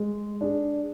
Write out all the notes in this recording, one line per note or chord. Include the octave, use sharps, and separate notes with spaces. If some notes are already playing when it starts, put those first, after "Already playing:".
Already playing: G#3
D4 G#4